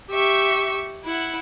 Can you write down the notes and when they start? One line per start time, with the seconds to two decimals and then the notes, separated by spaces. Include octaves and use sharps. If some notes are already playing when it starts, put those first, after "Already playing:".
0.11 G4 E5 C#6
1.04 E4 F#5